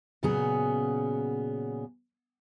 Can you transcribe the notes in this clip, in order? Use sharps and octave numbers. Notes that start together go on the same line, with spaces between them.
A#2 C#3 F#3 B3 C#4 G#4